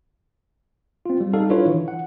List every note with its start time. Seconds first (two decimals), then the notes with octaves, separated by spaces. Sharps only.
1.06 C4 F4
1.21 G3
1.33 G3 D#4 A4 F5
1.50 D4 E4 F4 B4 C#5
1.66 D#3 E3
1.88 F#5